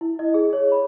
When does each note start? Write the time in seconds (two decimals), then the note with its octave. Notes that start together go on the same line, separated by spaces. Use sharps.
0.01 E4
0.19 D#5
0.34 G#4
0.53 C#5
0.72 B5